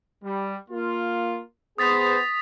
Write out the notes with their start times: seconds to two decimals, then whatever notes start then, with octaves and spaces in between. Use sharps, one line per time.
0.23 G3
0.69 A#3 F4
1.78 B3 G#4 C5 D#6 A6 B6